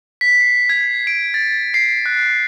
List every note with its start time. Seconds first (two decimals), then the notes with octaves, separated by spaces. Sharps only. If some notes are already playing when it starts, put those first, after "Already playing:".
0.21 B6
0.40 C7
0.69 G#6
1.07 D7
1.34 A6
1.74 C7
2.06 F#6